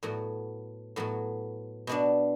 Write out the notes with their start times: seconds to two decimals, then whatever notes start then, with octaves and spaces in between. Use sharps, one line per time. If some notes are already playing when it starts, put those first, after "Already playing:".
0.03 A2 F#3 B3 F#4
0.96 A2 F#3 B3 F#4
1.87 B2 B3 D4 F#4